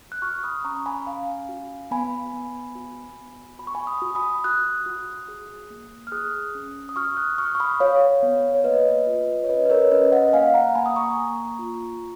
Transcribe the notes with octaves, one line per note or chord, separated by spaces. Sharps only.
F#6
F#4 C#6 F6
B5 D#6
C#4 A#5 C#6
G#5 B5
C#4 F5 G#5
F#4
B3 G#5 B5
B3
F#4
B3
F#4 B5
C#6
G#5 B5
B5 D#6
F#4
B5 D#6
F#4 D#6 F#6
F#4
G#4
A#3
F6
G#4 D#6 F#6
C#4
D#6
F#4 C#6 F6
D#6 F#6
F#4 C#6 F6
C#6
B5 D#6
F#4 C#5 F5
B3
C#5
A#3 B4 D#5
F4
C#5
C#4 B4 D#5
B4
A#4 C#5
C#4 B4 D#5
D#5 F#5
A#3 F5 G#5
F#5 A#5
A#3 G#5 B5
D#6
A#5 C#6
A#3
F4